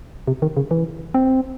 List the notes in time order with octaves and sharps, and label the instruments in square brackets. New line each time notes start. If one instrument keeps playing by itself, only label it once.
[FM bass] C3
D#3
C#3
E3
C4